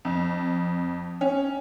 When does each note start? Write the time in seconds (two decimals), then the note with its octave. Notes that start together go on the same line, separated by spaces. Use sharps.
0.05 F2
1.21 C#4